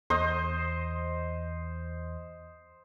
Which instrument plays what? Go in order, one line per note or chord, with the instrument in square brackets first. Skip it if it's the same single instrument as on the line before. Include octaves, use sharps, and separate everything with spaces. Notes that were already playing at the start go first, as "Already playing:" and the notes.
[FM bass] E2 [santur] C5 D#5